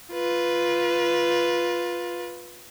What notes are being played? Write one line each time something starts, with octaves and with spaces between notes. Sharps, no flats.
F4 B4